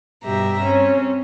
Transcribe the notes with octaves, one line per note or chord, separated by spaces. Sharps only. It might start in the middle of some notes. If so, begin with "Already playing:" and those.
G2 B2 G4 E5 A#5
C4 C#4